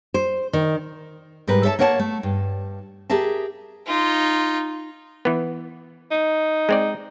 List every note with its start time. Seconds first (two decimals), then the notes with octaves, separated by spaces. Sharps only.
0.14 C5
0.53 D#3
1.47 G#2 G3 A#4 B4
1.63 A4 C#5 E5 G5 A5
1.79 A#3 A#4 C#5 F#5 G5 A5
1.99 A3
2.23 G2
3.10 G4 G#4 A#4 E5 A5
3.87 D#4 F4
5.25 E3 B3
6.11 D#4
6.69 G#3 C4 D5